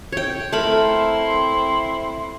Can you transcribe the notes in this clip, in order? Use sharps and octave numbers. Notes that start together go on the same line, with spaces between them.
C#5 G5
A3 C4 E4 A#4 B5 C6